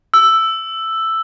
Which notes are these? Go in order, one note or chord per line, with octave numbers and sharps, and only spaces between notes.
E6